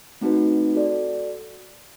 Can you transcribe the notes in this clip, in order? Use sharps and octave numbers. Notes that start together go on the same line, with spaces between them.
A3 C4 D#4 F#4 B4
F#4 A4 D5